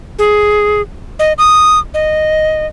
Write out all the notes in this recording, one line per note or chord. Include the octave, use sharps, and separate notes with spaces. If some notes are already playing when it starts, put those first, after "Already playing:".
G#4
D#5
D#6
D#5